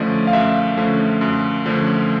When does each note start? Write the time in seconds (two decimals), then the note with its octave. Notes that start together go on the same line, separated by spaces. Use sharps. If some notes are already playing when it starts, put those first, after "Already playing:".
Already playing: F#2 D3 F3 A3 C#4 D5 D#5
0.27 F5
0.33 F#2 E5
0.77 D3 F3 A3 C#4
1.21 F#2
1.66 D3 F3 A3 C#4